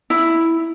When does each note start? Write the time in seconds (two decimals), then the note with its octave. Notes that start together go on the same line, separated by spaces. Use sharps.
0.10 E4